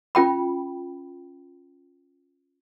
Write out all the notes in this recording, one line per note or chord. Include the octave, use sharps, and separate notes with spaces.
C#4 F4 G5 B5